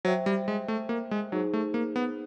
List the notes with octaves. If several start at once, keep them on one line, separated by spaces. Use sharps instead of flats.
F#3 C5 E5 G5
G3
G#3
A3
A#3
G#3
F#3 D#4 G#4 C5
A3
A#3
B3